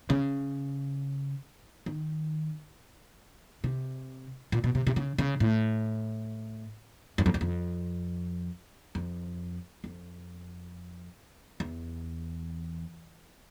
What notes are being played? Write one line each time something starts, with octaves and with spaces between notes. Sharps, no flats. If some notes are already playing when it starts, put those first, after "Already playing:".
C#3
D#3
C3
A#2
B2
C3
C3
C#3
C#3
A2
F#2
F2
E2
F2
F2
F2
E2